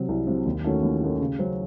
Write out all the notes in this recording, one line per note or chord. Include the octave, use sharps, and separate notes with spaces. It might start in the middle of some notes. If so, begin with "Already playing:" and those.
Already playing: C3 F#3
C2
C3 F#3
D#2
D#3 A3 C#4 F#4
D#2
D#3 A3 C#4 F#4
C#3
F#3 C#4 F#4 C5